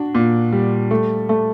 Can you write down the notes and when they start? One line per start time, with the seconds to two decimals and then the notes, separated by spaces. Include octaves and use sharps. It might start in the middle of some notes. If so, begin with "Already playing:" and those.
Already playing: D4 F#4
0.15 A#2
0.53 G3
0.91 A3
1.29 A3